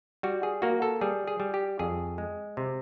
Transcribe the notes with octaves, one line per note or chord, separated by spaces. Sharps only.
G3 F#4
G#4
A#3 F#4
A4
G3 G#4
G#4
G3
G4
F2 G#4
G#3
C3